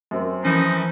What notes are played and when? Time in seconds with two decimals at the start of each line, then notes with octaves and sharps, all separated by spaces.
0.11 F#2 C4 A#4
0.45 E3 F3 C#4 D#4